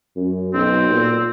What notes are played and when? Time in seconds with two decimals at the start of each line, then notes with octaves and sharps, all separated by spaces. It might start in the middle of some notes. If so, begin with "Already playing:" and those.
0.17 F#2
0.54 B1 C4
0.91 A#2